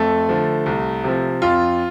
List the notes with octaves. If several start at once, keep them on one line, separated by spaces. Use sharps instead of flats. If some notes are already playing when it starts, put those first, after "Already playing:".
Already playing: F2 A3 A4
D3 F3
C2
C3 F3
F2 F4